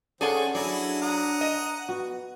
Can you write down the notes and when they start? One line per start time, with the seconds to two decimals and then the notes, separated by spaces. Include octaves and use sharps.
0.21 D#3 C4 C#4 G#4 A4 D5 F#5
0.55 F#3 D4 E4 G#4 D5
1.02 F#5 A#5 D#6
1.41 D#5
1.89 B3 F#4